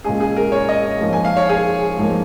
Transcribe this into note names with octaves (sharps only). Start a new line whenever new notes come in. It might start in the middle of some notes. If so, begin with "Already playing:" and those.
A#2 G#3 C#4 G#4
G#4
A#4
C#5
D#5
G#2 F3 A#3
G#5
F5
C#5
G#4
G#2 F3 A#3